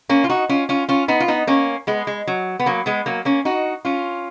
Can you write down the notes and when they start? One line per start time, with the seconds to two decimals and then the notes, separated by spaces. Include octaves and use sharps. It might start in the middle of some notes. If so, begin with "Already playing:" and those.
0.09 A#3 C#4
0.24 F4
0.29 D#4 F#4
0.49 C#4 F4
0.69 C#4 F4
0.89 C#4 F4
1.08 B3 D#4
1.20 F4
1.28 B3 D#4
1.47 A#3 C#4
1.87 G#3 B3
2.07 G#3
2.27 F#3
2.60 B3
2.66 F#3 A#3
2.86 G#3 B3
3.06 F#3 A#3
3.25 A#3 C#4
3.45 D#4 F#4
3.85 C#4 F4